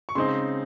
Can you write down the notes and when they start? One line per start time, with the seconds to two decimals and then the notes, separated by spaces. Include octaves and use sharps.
0.09 C#6
0.15 C#3 G#3 C4 D#4 C6